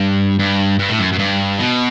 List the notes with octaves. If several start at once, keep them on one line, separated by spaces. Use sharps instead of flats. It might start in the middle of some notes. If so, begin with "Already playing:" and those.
Already playing: G2
G2
G2
A2
F#2
F#2
G2
B2